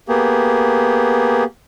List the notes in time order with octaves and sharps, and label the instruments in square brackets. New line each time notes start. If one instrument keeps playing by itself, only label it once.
[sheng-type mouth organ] A#3 B3 G4 G#4